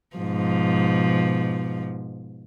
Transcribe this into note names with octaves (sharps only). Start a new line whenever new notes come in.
G#2 B2 F3